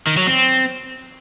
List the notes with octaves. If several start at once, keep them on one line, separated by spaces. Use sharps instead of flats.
D#3
F#3
C4